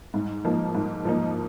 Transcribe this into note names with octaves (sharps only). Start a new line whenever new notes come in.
G#2
F3 A#3 D#4
G#2
F3 A#3 D#4